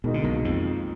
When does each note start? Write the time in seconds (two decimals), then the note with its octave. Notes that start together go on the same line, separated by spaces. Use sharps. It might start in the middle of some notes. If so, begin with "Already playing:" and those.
0.04 G#2 B2 D#3 A#3 D#4
0.14 D3
0.24 B1 B2
0.45 F2 F3